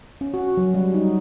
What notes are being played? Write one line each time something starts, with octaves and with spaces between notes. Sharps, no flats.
C#4
F#4
F#3
G3
D#4